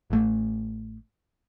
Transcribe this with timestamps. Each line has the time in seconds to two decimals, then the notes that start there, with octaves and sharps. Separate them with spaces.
0.10 A1 A3